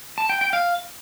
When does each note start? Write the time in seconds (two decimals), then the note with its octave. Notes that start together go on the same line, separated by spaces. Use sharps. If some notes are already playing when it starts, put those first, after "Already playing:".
0.18 A5
0.29 G5
0.41 G5
0.53 F5